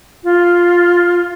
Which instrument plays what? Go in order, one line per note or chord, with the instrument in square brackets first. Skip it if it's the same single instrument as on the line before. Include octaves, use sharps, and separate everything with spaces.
[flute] F4